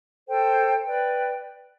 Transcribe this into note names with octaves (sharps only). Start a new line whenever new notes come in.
A4 C5 G5
B4 D5 G5